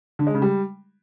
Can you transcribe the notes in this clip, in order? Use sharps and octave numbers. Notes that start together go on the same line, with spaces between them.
D3
G#3
C#3
G3